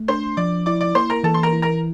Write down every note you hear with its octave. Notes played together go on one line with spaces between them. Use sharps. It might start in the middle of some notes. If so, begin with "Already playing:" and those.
Already playing: A3
D4 C5 C6
F3 D5 D6
E4 D5 D6
D5 D6
A#3 C5 C6
A#4 A#5
E3 A4 A5
C6
A#4 A#5
E4
A#4 A#5